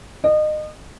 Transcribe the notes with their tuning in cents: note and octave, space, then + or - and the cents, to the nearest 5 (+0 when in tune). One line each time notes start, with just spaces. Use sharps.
D#5 -30